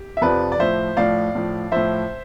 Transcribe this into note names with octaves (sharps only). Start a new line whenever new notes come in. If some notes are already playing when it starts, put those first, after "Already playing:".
Already playing: G4
E5
F2 C3 F3 B4 D5
D5
A2 F3 C5 E5
A2 F3 D5 F5
A2 F3
A2 F3 C5 E5